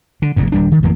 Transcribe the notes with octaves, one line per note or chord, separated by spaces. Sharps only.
D3
F1 E2 G2
D#1 G3 D4
D#3
A1 F2 E3 A#3